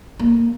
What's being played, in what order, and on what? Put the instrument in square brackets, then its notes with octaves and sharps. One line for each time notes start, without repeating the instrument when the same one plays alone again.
[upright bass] A#3